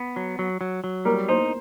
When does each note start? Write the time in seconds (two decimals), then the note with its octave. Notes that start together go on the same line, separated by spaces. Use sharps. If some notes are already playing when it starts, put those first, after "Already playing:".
Already playing: B3
0.16 F#3
0.39 F#3
0.61 F#3
0.84 F#3
1.05 G3 A#4
1.29 D#4 C5